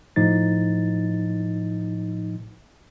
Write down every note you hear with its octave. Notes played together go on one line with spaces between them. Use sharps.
A2 F3 D#4 A6